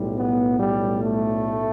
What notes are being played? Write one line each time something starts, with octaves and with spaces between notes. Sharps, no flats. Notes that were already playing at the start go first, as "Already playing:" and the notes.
Already playing: B1 A2 G3
B3
G3
A3